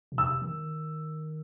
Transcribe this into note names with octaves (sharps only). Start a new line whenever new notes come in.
B2
C3 E6
D#3